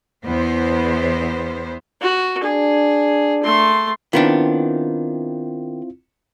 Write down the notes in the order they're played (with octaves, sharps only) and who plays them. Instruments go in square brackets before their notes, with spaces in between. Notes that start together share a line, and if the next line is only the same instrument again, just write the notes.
[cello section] E2 B3 C5
[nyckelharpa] F#4
[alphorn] D4 [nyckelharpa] G#4
[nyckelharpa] A3 C6
[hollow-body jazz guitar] D#3 B3 D4 [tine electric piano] C4 E4 F4